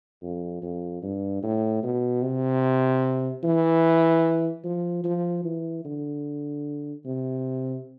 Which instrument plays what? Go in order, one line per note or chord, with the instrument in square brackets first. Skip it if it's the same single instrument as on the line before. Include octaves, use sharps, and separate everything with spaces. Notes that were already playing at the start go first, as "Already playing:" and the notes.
[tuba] F2
F2
G2
A2
B2
C3
E3
F3
F3
E3
D3
C3